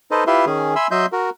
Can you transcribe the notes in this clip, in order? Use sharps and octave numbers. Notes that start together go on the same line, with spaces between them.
D#4 A4 B4 C5 D#5
E4 F4 G4 B4 E5 C6
D#3 C#4 G#4
E5 G#5 B5 C6 E6
F#3 D#5 E5 C6 G6
F#4 A#4